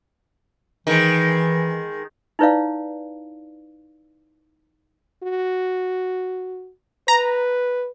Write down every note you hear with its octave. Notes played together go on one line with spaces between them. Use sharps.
D#3 E3 G#3
D#4 E4 B4 C#5 D5 F5
F#4
B4 A#5